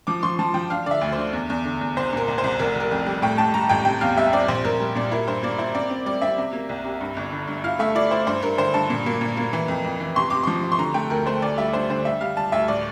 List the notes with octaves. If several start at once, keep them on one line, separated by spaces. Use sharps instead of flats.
F3 D6
F3 C6
F3 A5
F3 G5
D4 F5
D3 D5 E5
D2
D3 C5
E2
E2
D3
E2
C2 C5
A#2 A#4
C2
C5
C2
F1 A#4
F1 A#4
F2
G3
A2 G5
A2 A5
G3 A#5
A1 G5
C3 G5
E2 F5
G3 E5
C4 D5
A#1 C5
A#1 A#4
G3
A#2 D5
E4 A#4
G2 C5
A#3 D5
E4 C5
C4 D5
C4
G3 D5
C4 E5
C3
A#3
C2
C3
G2
G1
D3
G2
E4 F5
A3 E5
E4 D5
E4 C5
G2 C5
G2 A#4
D3 C5
G2 A5
A#2
A#3
A#2
A#3
E3
F2
F2
E3
C3 C6
C3 D6
F3 C6
C3
C6
D3 A#5
A3 G5
D2 A#4
A3 C5
D2 D5
G3 E5
D4 C5
D3 C5
G3 E5
G3 F5
G3 A5
D2 E5
A2 D5